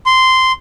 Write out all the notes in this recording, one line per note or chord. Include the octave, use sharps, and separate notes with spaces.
C6